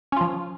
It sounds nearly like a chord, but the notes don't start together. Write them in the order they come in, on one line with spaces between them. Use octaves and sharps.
C#4 F4 F3